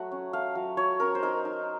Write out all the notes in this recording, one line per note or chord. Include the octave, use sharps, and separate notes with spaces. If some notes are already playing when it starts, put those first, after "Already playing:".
Already playing: F#3 A3 F#5
C#4
A3 F5
F#3
F#3 C#5
C#4 A#4
C5
D#4 A#4
D#4